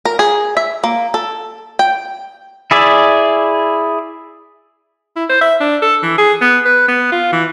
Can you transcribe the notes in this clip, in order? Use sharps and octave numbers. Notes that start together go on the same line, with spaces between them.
A#4
G#4
E5
A#3
A4
G5
E4 G#4 D5 E5
E4
C5
E5
D4
A4
E3
G#4
B3
B4
B3
F4
E3